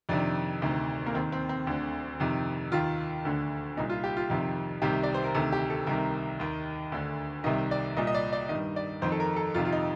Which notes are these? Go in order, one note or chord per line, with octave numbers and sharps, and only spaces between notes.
F2 C3 D#3 D4
D2 C3 D#3
A#3
D#2 D#3 C4
C4
C4
D2 D3
F2 C3 D#3
D#2 D#3 F4
D2 D3
C2 A#2 D#4
F4
G4
F4
F2 C3 D#3
C2 C3 D#3 G4
D5
C5
A#4
D2 C3 D#3 A4
G4
A4
C2 C3 D#3 A#4
D#2 D#3
D2 D3
C2 C3 D#3 D#5
D5
C2 A#2 D#5
D#5
D5
D5
G2 D#3 D#5
D5
F2 D#3 C5
A4
A#4
A4
F2 C3 D#3 F4
F4
D#4